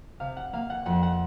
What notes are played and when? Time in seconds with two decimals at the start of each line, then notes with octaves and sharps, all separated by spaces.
0.20 C3 F5
0.37 F#5
0.53 A#3 F5
0.70 F#5
0.85 F2 F#5
1.03 F#5